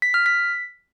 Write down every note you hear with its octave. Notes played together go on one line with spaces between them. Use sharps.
B6
F6
B6